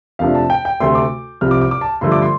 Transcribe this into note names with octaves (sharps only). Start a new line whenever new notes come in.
F2 C3 F3 A3 D4 F5
A5
G5
G5
D2 C3 A3 C6
D6
C2 C3 F3 F6
D6
D6
D6
A5
G2 D3 F3 A3 C6
D6
C6